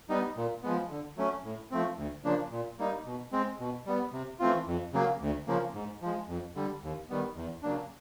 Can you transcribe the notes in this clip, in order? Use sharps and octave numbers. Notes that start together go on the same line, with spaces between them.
G3 B3 D#4
A#2
F3 G#3 B3
D3
F#3 A3 C#4
A2
F3 A3 C4
D2
C#3 F3 A#3 D4
A#2
G3 A#3 D#4
B2
G#3 C4
B2
G3 B3
C3
E3 A3 C4 F4
F2
C#3 F#3 A#3
D2
C#3 F3 A#3
G#2
F3 G#3
F2
D3 G3
D#2
D#3 G3 B3
E2
C#3 F#3 A#3 D4